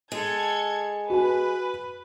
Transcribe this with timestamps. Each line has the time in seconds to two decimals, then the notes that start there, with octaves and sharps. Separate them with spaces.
0.12 G#3 A4 G#6 C#7
1.10 F#4 B4 G#5